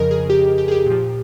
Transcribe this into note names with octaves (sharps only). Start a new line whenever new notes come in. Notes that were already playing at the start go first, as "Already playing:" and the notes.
Already playing: F2 C#3 F3 A#4 D#5
G#4
G4
G4
G#4
G4
A#2 F3